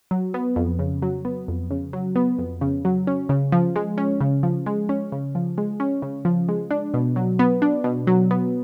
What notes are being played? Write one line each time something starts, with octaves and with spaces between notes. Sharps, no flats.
F#3
B3
F2
C#3
F#3
B3
F2
C#3
F#3
B3
F2
C#3
F#3
C#4
C#3
F3
G#3
C#4
C#3
F3
G#3
C#4
C#3
F3
G#3
C#4
C#3
F3
G#3
D4
B2
F#3
B3
D4
B2
F#3
B3